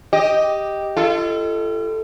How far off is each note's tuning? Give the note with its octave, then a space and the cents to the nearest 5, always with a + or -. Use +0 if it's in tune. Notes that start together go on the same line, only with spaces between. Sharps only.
G4 +0 D#5 +5
F4 -40 A4 +0